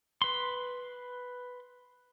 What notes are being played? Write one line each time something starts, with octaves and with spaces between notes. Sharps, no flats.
B4 C6